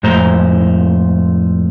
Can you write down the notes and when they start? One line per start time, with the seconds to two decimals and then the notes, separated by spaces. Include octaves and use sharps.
0.03 F2 A2 G#3 A3 C5 A#5